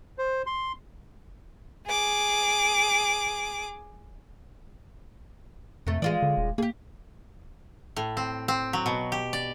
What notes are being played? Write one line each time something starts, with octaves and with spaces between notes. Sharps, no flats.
C5
C6
G#4 D6
F2 C3 A3
E3 G#3 F4 D5
D3
D#1
A#3 G4 G#4
A2
C4
C4
F#3
B2
G4
D5